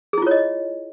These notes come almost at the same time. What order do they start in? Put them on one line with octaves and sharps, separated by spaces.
G#4 E4 F4 C#5 D#5